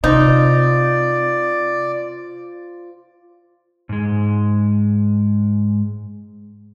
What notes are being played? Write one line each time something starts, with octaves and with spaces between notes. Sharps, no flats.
C3 D#4 F4 C5 D5
G#2 G#3